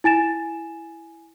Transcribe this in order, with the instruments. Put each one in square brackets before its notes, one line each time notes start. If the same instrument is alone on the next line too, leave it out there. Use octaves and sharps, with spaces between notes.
[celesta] E4 G#5 A6 E7